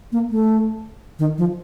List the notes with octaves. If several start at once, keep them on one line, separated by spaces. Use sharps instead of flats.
A#3
A3
D#3
F3